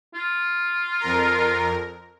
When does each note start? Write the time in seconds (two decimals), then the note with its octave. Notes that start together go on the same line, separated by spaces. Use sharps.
0.14 F4
1.00 F2 A#4